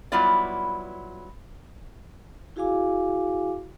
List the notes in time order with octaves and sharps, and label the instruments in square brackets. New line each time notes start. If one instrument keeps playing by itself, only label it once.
[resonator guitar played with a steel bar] F#3 G3 B3 E4 F4 D5
[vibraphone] E4 F#4 G#4 F5 G#5 D6